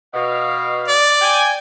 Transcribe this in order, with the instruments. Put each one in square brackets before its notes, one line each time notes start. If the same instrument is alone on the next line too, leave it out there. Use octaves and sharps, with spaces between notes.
[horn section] B2 F5
[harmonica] D5
[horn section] G5 G#5